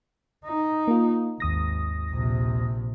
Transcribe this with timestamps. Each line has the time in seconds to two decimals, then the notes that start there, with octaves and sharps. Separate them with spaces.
0.45 D#4
0.88 A#3 F4
1.40 G#1 D#2 D#6 A#6
2.11 A#1 C3